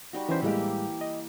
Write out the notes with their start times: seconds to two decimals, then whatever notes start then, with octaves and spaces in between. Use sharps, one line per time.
0.13 G3 D#4 F#4
0.29 E3 C#4 C5 E5
0.42 A2 E3 G3 G#3 A#3 G4
1.01 D#5